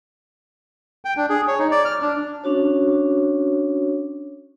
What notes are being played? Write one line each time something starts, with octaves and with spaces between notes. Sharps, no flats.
G5
D4
G#4
C#5
D#4
D5
F6
D4
C#4 D4 F#4 C#5